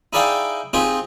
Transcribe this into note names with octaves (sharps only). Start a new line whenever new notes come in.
D#4 E4 G#4 D5 F5 G5
C4 D#4 F4 G4 G#4